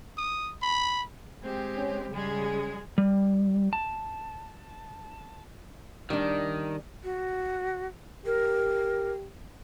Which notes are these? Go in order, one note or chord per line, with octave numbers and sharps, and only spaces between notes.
D#6
B5
G#3 C4 G4
C#4
C#3 G3 G#3 G#4
G3
A5
D#3 G3 D4
F#4
G4 A#4